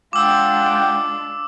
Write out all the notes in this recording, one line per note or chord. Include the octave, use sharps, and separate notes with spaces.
G#3 D4 F4 F#5 G5 D6 E6